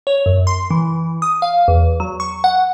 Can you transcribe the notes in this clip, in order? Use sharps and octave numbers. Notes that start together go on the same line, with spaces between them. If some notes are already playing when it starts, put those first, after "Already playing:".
C#5
F#2
C6
E3
D#6
F5
E2
F#3
C#6
F#5